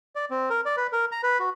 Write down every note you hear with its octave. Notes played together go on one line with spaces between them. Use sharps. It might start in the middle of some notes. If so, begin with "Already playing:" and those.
D5
C4
A#4
D5
B4
A#4
A#5
B4
F#4